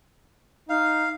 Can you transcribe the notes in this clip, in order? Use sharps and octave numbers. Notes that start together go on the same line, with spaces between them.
D#4 F5